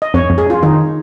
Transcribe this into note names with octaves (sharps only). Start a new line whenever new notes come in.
D#5
F2 C#5
F2
G#4
C#4 F4
D#3 D#4